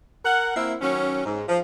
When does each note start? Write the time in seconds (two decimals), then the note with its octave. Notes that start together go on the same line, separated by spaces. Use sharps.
0.24 A#4 F#5
0.56 A#3 C4 E4
0.81 D#3 F#3 C#4
1.25 G#2
1.48 F3